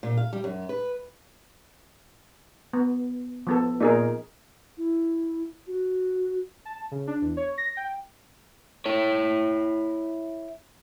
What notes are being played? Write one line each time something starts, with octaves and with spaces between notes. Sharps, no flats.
A#2
F5
G3
F#2
B4
B3
F3 B3 A4
A#2 D#4 G#4 A#4
E4
F#4
A5
C#3
D4
E2
C#5
A#6
G5
E4 C#5